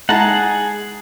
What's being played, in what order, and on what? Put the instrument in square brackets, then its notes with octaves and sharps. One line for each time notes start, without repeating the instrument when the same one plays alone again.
[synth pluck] G#3 D#4 E4 [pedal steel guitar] G#4 F#5 [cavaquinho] A5 A#5